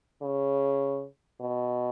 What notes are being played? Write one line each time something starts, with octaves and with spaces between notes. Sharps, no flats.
C#3
B2